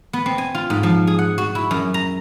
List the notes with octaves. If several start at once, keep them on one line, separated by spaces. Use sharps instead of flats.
B3
C4
G#5
F4
G#2
F3
G#4
F#5
F#4
E4
F#2
A#5